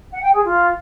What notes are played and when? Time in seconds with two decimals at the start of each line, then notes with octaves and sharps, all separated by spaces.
0.10 F#5
0.22 G5
0.33 G#4
0.44 F4